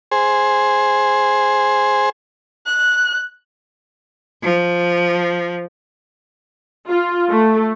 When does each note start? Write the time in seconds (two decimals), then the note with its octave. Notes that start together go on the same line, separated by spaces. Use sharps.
0.11 G#4 C5
2.67 F#6
4.43 F3
6.89 F4
7.30 A3